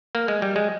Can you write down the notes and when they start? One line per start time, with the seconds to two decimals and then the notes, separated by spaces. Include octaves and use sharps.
0.15 A#3
0.28 G#3
0.42 G3
0.56 G#3